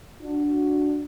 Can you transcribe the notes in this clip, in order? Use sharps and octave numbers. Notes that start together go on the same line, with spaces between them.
D4 F#4